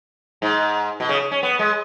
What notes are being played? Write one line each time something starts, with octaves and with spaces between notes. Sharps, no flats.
G#2
B2
C#3
C#4
B3
G#3